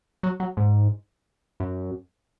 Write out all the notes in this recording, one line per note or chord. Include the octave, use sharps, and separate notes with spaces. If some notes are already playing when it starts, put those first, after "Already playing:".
F#3
F#3
G#2
F#2